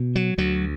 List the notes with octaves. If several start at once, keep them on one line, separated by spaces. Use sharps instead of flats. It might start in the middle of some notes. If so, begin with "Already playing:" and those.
Already playing: B2
F#3
D2 F#3